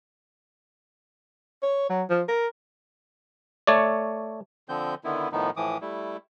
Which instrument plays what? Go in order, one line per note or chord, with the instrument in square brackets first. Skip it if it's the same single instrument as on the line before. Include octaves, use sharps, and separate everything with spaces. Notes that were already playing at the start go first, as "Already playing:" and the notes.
[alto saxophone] C#5
F#3
F3
A#4
[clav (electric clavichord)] A3 C#5 D5
[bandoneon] D3 F3 C4 G6
D3 D#3 B3 E4
A2 D#3 F3 B3 D#4
A2 E3 F3 D6 D#6
G3 A3 E4